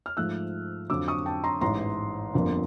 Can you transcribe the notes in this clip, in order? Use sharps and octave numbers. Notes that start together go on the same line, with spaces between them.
F6
G#2 F3 A3 E6 F#6
F2 D3 F#3 D6 E6
C#6 D#6
G5 A5
A#5 C6
A1 G#2 E3 A#5 C6
G1 F2 D3 F3 A#3